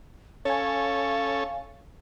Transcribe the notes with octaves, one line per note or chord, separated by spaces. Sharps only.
C#4 A4 C#5 F5 G#5